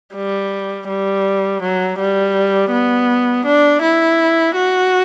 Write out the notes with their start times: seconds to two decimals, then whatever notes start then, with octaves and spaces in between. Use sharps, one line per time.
0.15 G3
0.88 G3
1.62 F#3
1.99 G3
2.72 B3
3.45 D4
3.82 E4
4.55 F#4